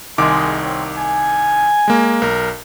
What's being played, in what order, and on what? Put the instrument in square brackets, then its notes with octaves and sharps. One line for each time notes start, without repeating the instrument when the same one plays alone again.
[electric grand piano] C2 D#3 D6 [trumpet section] G#3
[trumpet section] C4 A#4 C#5
G#5
[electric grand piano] G#3 A#3
B1 A#4